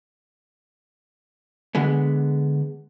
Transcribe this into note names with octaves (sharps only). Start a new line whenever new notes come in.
D3 G#3 B3